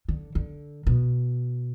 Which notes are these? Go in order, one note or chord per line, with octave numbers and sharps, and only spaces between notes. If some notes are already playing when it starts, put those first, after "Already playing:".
D3
D3
B2